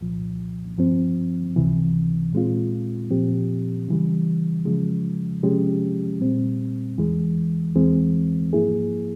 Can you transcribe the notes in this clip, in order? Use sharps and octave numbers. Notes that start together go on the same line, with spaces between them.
C2 A#2 F3
G2 F3 C4
C#2 C3 E3
A#2 G#3 C4 F4
A#2 F3 C4 G4
C#3 E3 G3
C#3 F3 G#3
C3 F3 G#3 C#4 G4
A#2 G3 C4
E2 E3 G#3
E2 E3 G#3 C4
G#2 F3 A#3 E4 G#4